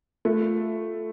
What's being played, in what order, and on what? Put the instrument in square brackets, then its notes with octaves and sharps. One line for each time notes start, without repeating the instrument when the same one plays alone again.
[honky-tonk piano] A3 [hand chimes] F4